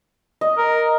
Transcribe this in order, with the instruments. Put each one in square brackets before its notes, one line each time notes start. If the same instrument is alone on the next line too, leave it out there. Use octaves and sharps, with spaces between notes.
[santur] D#5
[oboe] A#4